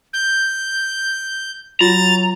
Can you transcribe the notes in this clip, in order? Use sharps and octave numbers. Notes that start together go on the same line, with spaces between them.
G6
F#3 F4 A#5 A6